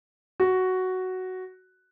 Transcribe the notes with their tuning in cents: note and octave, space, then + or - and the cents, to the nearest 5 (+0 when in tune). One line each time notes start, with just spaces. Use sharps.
F#4 +5